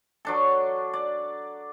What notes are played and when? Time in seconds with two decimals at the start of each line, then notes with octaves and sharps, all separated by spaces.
0.25 F#3 D4 A4
0.94 D5